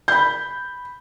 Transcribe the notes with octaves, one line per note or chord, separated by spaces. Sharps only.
B5 G6